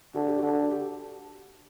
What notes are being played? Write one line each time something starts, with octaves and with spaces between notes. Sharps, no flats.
D3 F#4
G4
D3 F#4
G4